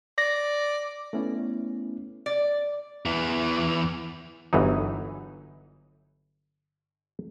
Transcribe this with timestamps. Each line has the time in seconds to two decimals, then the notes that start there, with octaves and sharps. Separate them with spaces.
0.18 D5 A#6
1.13 A3 B3 C#4 E4
2.26 D5
3.05 E2 E3
4.53 G1 E3 F#3 D#4